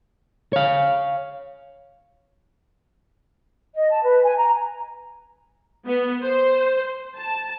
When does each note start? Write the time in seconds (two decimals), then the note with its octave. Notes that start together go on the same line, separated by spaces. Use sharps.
0.53 C#5 F5
3.75 D#5
3.90 A5
4.03 B4
4.24 G#5
4.38 A#5
5.86 B3
6.22 C5
7.17 A5